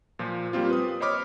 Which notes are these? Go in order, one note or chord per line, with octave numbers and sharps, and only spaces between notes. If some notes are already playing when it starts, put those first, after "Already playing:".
A#2 F3
G3 A#3 C4 F4
B4 D#6
C5 C#5 D#5 B5 D6 F6